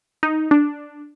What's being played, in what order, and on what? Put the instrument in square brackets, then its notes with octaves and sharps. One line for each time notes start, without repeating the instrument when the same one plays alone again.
[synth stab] D#4
D4